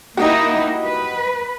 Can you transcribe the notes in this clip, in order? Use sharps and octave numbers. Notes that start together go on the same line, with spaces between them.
A#3 D#4 E4 F#4 G4 D#5
B4